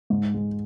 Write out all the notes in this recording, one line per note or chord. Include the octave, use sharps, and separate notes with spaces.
G#2
G#3